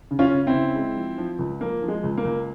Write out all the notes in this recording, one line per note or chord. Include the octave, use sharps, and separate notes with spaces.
C#3
C#4 F4
C#3
C4 E4
C#3
G#3
F3
F3
C#2
F3 A#3
F3
G#3
C#2
A#3
C#2